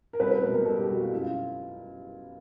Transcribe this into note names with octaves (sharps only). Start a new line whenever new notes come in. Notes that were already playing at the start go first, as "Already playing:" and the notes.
A#4
C2 B4
B4
B2 G#3 A#4
A#4
C2 A4
G4
B2 G#3 F#4
F4
F#2 E4
F4